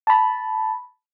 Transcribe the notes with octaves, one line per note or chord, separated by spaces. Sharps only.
A5 B5